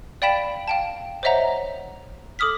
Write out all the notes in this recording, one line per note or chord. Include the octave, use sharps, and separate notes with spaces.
D5 F5 G5 B5 B6 E7
F5 G5 A5
C5 C#5 D#5 E5 F#5 A#5
A4 D6 D#6 F6 B6